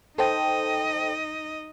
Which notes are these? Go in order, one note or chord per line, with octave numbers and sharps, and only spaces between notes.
D#4 A4 C5 D#5 G5